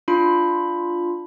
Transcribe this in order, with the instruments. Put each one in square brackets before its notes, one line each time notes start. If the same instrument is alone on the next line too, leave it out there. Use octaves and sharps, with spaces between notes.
[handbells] D4 F4 B5